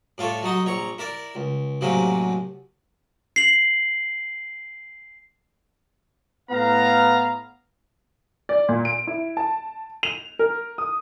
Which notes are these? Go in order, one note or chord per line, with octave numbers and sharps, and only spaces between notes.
A2 F4 A4 C#5 D5
F#3 D#4 F#4 D#5
A#1 C#5 A#5 C#6
E4 A#4 D5
C#2
D2 A2 C3 F#3 A#3 C#4
C7 F#7
A2 B3 F5 A#5
D5
A#2
D7
E4
A5
F7
A#4
D#6